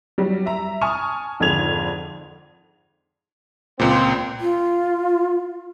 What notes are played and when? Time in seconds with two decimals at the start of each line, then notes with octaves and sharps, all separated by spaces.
0.18 F#3 G3
0.46 E5 A#5
0.81 G#5 A5 C#6 D#6 F6
1.40 G#1 F2 G#2 D3 G#6 F7
3.79 C#2 A#2 C4
4.41 F4